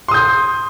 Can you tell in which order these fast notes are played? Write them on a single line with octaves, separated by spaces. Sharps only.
C6 D#6 G6